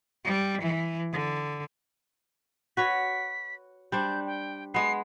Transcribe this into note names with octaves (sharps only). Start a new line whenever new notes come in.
G3
E3
D3
F#4 B4 C#5 B6
G3 D4 C5 G6
G5
G#3 B3 C7